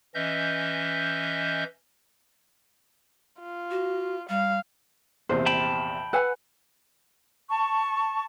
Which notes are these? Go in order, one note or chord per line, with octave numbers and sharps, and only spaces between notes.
E3 C#4 D#5 E5 G6
F4
F#4
G3 F5
A#1 E2 C3 C5
G5 A5 B5
B4 F#5 G#5 E6
A5 C#6